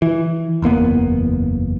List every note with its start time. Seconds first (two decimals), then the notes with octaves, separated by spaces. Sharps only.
0.02 E3
0.62 F#1 E2 A#3 B3